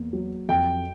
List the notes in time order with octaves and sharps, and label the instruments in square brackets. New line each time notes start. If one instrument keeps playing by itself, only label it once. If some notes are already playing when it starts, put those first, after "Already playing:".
Already playing: [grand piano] E2 A#3
F#3
[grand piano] F2 [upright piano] G5